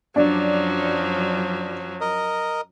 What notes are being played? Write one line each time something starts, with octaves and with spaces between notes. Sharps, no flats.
F#2 F3 F#3 D4
A#4 D#5